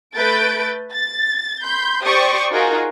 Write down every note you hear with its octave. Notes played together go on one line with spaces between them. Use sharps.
A3 B4 G6 A6 D7
A6
B5 C6 G6
G4 C5 D5 C#6 D#6
D#4 F4 F#4 G#4 A#4